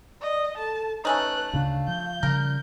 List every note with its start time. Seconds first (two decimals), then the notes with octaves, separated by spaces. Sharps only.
0.22 D5 D#5
0.57 A4 A5
1.05 A3 C#4 D#4 B4 F#6
1.53 D2 C#3 D4 F5
1.88 F3 G6
2.23 C#3 F3 G3 A#4